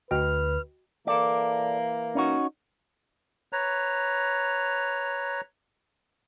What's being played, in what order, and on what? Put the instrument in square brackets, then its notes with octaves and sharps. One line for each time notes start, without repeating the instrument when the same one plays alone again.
[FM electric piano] D2 D3 [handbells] F#4 D#5 G5 [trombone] B4 [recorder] F6
[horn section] E3 A#3 [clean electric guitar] A4 D5
[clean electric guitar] C#4 D#4 F#4
[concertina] B4 C#5 A#5